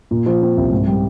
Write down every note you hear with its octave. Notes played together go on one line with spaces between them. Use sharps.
A#2
F3
C4
C2
G#2
G3